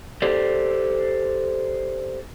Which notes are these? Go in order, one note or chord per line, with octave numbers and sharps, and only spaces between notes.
G4 A4 C5 D5